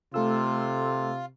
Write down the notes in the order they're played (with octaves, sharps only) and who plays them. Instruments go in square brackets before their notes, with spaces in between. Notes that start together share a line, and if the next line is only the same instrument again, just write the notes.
[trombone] C3 [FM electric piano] A3 A4 E6 [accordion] F4